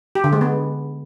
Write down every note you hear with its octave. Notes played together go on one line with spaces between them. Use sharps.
G4
D3
G#3
B3